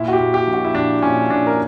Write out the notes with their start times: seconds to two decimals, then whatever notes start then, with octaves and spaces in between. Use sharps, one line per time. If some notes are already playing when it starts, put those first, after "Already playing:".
Already playing: A#2 E4
0.08 F#4
0.13 G4
0.20 A#2
0.34 G4
0.47 A#1
0.54 F#4
0.65 E4
0.74 A#1 D4
1.02 A#2 C#4
1.30 A#2 D4
1.47 A#4